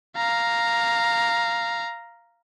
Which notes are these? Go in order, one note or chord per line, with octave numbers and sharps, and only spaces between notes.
F5 A#5